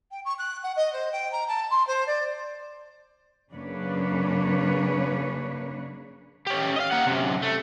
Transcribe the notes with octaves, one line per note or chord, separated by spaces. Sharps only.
G5
C#6
F#6
F#5
D#5
C5
G5
A#5
A5
C6
C5
D5
F#2 C#3 A#3 D4 B4 C#5
C#4 G4
D#5 F5
A#3 F#5
F#2 C3
A3